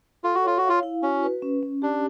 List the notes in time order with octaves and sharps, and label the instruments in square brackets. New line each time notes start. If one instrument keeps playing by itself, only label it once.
[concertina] F4 [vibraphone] A4
[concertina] F#4
[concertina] F4 [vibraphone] C#5
[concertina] F#4
[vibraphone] F5
[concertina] F4
[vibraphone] E4
[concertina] C#4 [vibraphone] F#4
[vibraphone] B4
C#4
C#4
[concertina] D4 [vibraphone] G4